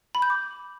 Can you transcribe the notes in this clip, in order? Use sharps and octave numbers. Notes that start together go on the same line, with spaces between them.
B5
G6
D6